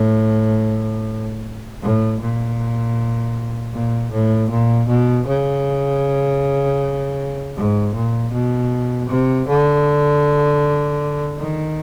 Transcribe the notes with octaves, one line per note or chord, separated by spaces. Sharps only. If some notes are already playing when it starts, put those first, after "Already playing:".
Already playing: A2
A2
A#2
A#2
A2
A#2
B2
C#3
G#2
A#2
B2
C3
D3
D#3